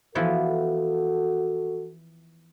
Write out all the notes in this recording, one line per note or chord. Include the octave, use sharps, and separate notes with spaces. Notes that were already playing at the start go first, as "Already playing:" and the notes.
E3 F3 B3 F#4 A4